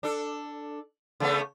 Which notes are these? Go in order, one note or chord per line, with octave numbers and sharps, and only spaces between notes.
D4 A4
C#3 A3 B3